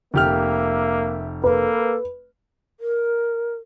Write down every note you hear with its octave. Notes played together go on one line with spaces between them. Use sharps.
F1 A#3 G4 E5 F6
A#3 A4 B4
A#4